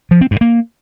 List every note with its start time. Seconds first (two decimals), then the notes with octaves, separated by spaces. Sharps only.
0.11 F3
0.21 C4
0.31 G2
0.41 A#3